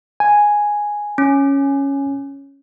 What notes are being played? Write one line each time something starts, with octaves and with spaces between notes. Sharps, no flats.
G#5
C#4